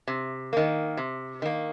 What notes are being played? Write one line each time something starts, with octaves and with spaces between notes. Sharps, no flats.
C3
D#3 A#3
C3
D#3 A#3